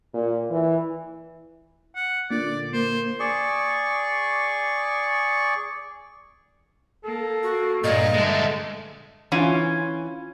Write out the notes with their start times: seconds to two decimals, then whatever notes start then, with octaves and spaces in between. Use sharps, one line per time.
0.14 A#2
0.50 E3
1.96 F#5
2.31 A#2 D3 D5
2.73 A#3 C5
3.20 G#4 D5 C#6
7.04 A#3 A4
7.43 F#4
7.84 G2 A#2 D#5
8.14 D3 G#3 A3
9.32 E3 C#4 F4